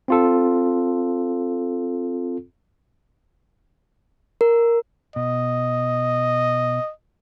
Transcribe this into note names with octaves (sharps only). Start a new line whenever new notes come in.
C4 F4 A4
A#4
B2 D#5